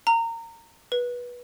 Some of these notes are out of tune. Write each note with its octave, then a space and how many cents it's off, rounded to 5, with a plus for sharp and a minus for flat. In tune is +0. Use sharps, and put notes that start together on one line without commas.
A#5 -25
B4 -20